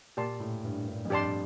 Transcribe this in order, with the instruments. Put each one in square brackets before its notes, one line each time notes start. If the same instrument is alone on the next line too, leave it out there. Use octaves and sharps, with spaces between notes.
[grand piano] A#2 [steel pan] G4 D5 A5 C6
[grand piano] A2
G2
G2
F2
[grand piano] G2 [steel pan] G4 D5 A5 C6